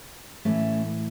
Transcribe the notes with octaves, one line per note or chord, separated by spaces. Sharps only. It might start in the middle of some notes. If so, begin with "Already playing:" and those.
A2 E3 A3 C#4